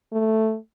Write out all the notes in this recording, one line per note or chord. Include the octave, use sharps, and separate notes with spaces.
A3